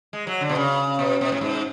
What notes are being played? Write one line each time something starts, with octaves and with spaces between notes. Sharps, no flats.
G#3
F#3
D3
B2
C#3
B2
B2
A2
G#2